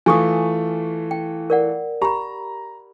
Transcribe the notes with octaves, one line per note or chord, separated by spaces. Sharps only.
E3 A3 F4 G#5 C#6 D#6
G5
A#4 D5 F#5
G4 A#5 B5